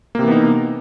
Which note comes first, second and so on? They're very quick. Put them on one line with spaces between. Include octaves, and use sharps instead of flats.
A#3 C3 E3 B3 D#4